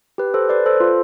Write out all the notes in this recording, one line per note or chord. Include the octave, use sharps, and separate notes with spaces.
G4 B4
A4 C5
B4 D5
A4 C5
F4